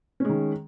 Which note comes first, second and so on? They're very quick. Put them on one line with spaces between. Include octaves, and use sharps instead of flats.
C#4 G#3 D#3